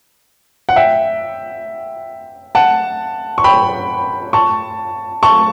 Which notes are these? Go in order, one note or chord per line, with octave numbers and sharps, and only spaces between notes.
F#5
E5 G5
F#5 A5
C#6
G5 B5
A5 C#6
A5 C#6